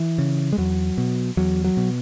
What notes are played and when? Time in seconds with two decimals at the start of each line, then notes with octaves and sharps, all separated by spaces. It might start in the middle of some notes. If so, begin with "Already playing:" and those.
Already playing: E3
0.18 C#3
0.53 G#3
0.58 E2 F#3
0.98 B2
1.37 E2 F#3
1.64 F#3
1.77 B2